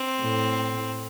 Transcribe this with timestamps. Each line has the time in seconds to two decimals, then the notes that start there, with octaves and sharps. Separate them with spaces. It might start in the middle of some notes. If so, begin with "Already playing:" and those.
Already playing: C4
0.21 A2